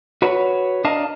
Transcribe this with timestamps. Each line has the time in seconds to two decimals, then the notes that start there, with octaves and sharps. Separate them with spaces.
0.22 F#4 B4 C#5
0.84 D4 A#4 D#5 F5 A5